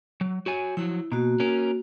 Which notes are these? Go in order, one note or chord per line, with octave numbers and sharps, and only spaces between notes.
F#3
F#4 C#5 G#5
F3 F#3 E4
B2 A#3 F#4
C#4 A#4